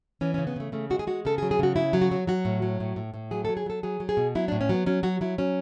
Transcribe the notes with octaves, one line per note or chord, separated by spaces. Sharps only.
E3 C#4
C#3 C#4
B3
C#3 A3
C#3 A3
G#3 F#4
G#4
G#3 F#4
C#3 A4
G#4
F#3
G#4
C#3 F#4
C#3 E4
F#3
F#4
F#3
F#3 F#4
A2
F#3
A2
A2
A2
F#3 G#4
A4
F#3
G#4
F#3 A4
F#3 G#4
F#3
G#4
B2
F#3 E4
A2 D4
C#4
F#3 B3
F#3 C#4
F#3 F#4
F#3 E4
F#3 C#4